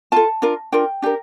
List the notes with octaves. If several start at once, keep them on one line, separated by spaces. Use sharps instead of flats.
F4 A4 A5
D4 F4 A#4
D4 F4 A#4 G5
D4 G4 A#4